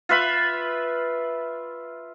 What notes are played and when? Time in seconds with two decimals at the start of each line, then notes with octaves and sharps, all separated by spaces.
0.09 F4 B4 E5 B5